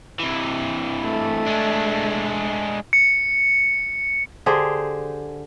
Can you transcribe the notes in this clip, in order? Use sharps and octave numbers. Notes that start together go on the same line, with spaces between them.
C3 E3
A3
G#3 D4
C#7
D3 G4 G#4 C5